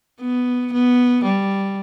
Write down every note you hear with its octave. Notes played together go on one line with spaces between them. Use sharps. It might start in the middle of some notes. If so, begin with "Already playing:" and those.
B3
B3
G3